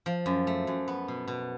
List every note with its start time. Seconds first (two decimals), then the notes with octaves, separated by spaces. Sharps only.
0.06 F3
0.26 F#2
0.47 A3
0.67 F#2
0.88 B3
1.08 B2
1.28 B2